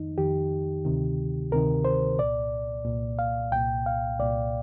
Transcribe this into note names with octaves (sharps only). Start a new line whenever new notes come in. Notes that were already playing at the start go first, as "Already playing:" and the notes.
Already playing: F2 D#3 D#4
F2 D#3 G4
D2 C3 D#3
D2 C3 D#3 A#4
C5
C2 A#2 D5
C2 A#2
F5
C2 A#2 G5
F5
C2 A#2 D5